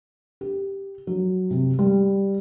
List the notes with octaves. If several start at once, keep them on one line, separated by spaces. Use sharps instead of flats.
G4
F#3
C3
G3